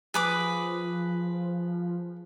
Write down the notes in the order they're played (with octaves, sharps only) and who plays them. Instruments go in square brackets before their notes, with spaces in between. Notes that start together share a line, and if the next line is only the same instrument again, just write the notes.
[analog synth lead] F3 [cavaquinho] G#4 B4 D6